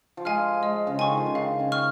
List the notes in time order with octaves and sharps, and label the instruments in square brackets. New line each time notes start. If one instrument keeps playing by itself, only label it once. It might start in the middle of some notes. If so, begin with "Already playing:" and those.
[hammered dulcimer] F3
[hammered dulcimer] G#3 [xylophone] F5 G#5 F6
[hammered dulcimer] G#3 [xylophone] D#5
[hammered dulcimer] C#3
[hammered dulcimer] D#3 [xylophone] G#5 C#6
[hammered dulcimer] F3
C#3
[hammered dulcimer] D#3 [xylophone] F5
[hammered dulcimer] C#3
[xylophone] C#6 F6